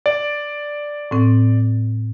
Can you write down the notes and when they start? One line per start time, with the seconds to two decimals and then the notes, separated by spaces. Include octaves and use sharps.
0.06 D5
1.11 A2 C4